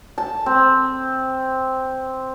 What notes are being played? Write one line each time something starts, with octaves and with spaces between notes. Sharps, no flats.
A5
C4